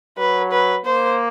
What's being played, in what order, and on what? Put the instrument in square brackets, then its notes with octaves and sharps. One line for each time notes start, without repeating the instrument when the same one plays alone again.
[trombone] F#3 [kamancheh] B4
[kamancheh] B4
[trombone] A#3 [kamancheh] C5